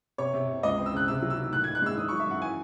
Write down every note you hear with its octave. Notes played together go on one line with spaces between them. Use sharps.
C3 C#5
C3
C3
C#2 D#5
C4
E6
C#3 F#6
C3 E6
F#3
E6
D#3
A2 F#6
G#6
D#4
F#6
G#3 E6
D#3 D#6
C#6
F#3
E5
F#2 F#5
E3 G#5